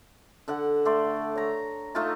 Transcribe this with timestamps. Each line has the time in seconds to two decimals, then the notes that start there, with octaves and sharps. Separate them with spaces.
0.48 D3 A4 F#5
0.85 A3 D5 C6
1.35 C#5 A#5
1.95 A3 D#4 F4 A5